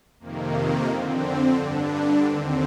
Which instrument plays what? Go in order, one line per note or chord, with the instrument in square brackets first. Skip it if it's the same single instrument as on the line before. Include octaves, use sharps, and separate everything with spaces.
[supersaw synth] F2 C3 D#3 A#3
A#3
F2 D3 C4
G2 D3 D4
D#2 D3 C4